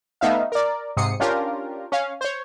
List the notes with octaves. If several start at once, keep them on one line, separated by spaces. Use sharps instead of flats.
A3 B3 D#4 E5 F5
A#4 D5
G#2 C3 D#6 C7 C#7
C#4 D4 F4 G4 A#4
C#4 F5
C5 C#5